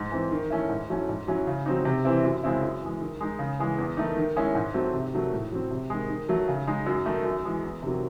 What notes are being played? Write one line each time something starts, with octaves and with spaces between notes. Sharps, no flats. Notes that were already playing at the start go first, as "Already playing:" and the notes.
Already playing: G#2
E3 C4
D#3
A3 C#4 E4
G#2
F#3 A3 C#4 E4
G#2
F#3 C#4 E4
C#3
F#3 C4 D#4
C3
E3 C4 E4
F#2
C#3 G#3 C4 E4
F#2
E3 G#3
D#3
G#3 D#4
C#3
E3 G#3
E2
D#3 A3 D#4
D#3
G#3 C#4 E4
G#2
F#3 A3 C4
C3
D#3 F#3 A3
A2
F#3 C4
C3
D#3 G#3
D#3
F#3 A3
C#3
G#3 D#4
F#2
D#3 A3 D#4
F#2
E3 G#3
E2
C3 D#3 F#3